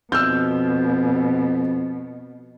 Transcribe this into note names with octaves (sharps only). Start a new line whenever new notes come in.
F2 B2 E6 F6 G6